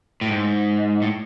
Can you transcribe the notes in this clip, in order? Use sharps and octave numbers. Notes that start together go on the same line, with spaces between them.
A2
G#2
A2